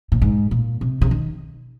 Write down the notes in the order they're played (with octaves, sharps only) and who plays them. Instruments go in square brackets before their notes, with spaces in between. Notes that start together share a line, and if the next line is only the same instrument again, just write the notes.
[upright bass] A#2
G#2
A#2
C3
C3
D#3